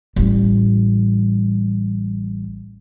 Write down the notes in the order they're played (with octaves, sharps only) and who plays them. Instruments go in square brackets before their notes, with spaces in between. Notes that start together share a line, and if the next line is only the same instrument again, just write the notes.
[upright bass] A1 G3